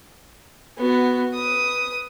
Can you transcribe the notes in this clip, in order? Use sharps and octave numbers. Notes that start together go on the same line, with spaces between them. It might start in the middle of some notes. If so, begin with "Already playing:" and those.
B3 F#4
B4 D#6